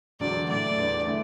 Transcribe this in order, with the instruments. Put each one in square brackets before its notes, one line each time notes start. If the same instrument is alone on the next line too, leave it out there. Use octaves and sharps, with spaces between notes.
[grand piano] E1 E2 D3 F#3 [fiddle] D5
[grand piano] A2 A3 E4 [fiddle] D5
[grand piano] E2 E3 D4
D3 A3 E4